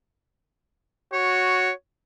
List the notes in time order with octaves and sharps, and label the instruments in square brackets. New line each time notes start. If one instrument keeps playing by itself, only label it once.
[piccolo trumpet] F#4 [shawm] C#5